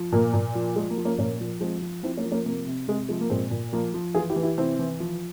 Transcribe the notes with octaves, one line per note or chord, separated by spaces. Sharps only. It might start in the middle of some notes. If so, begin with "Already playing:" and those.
Already playing: F3
A#2 A#3
A#2
F3
F3 G#3
A#3
F3
A#3 C#4
A#2 A#3 C#4
F3
F3 G#3 C4
F3
F3 C4 E4
A#3 C#4
F3
A#3 C#4
C3 A#3
C3
C3 G#3
F3 G#3
A#3
A#2 G#3 C4
A#2
F3 A#3
F3
E3 F4 G#4
E4 G4
E3
E4 G4
C3 C4 E4
E3
F3